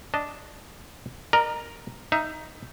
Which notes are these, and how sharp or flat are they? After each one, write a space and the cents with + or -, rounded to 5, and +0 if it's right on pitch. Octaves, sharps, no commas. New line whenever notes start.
D4 -5 D#5 +0 A5 +0
A#4 +0 D#5 -45 A#5 +0
D#4 +0 E5 +20